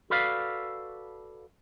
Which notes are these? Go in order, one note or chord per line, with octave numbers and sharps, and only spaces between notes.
F#4 A4 B4 D5 F5